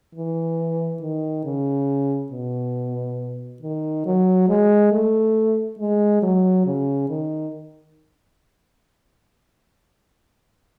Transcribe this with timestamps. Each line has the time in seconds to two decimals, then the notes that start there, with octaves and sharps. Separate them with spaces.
0.15 E3
1.01 D#3
1.45 C#3
2.31 B2
3.62 D#3
4.06 F#3
4.48 G#3
4.92 A3
5.79 G#3
6.22 F#3
6.66 C#3
7.09 D#3